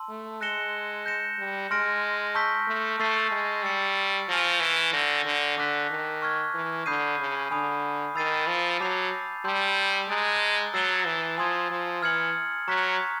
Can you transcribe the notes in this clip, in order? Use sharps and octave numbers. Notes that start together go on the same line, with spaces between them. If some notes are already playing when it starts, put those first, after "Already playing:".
Already playing: A5 C6 E6
A3
G#3 F#6 A#6 C#7 E7 G7
G6 A#6 C#7 E7
G3
G#3 C6 F6 A#6 D7
A5 C#6 E6 G6 B6
A3
A3 C#6 E6 A6 C7 D#7
G#3
G3 E6 A6 C#7
F3 G#5 C#6 F6 A#6 D#7
E3
D3 E6 G6 A#6
D3
D3 A5 D6 F#6 B6
D#3
C#6 F6 G#6
E3
D3 B5 D#6 G6 C7 D#7
C#3
D3 G#5 B5 D#6
D#3 B5 E6 A6 C7 D#7
F3
F#3 A5 D6 G6 C7 F7
G3 A5 C6 E6 G6
G#3 A#5 D#6 F#6 A6 D7
F#3 E6 A6 C7 E7 G7
E3
F3 G#5 C6 D#6 G#6
F3
E3 F6 G#6 C#7 F#7
F#3 A#5 C#6 F#6 B6